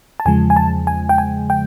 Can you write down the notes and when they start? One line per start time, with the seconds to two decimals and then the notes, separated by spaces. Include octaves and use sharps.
0.20 A5
0.25 E2 C#3 F3 G#3 G#5
0.50 G#5
0.56 A5
0.87 G#5
1.09 G5
1.18 G#5
1.50 G5